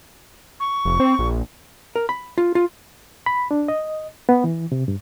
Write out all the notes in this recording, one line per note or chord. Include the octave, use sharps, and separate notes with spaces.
C#6
F1
C4
A#1
A#4
B5
F4
F4
B5
D4
D#5
B3
E3
C3
G2